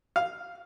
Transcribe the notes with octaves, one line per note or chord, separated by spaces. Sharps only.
F5